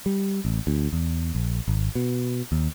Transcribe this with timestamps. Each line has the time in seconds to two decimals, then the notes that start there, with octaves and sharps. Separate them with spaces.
0.06 G3
0.45 A1
0.67 D2
0.93 E2
1.35 A#1
1.68 G#1
1.95 B2
2.52 D#2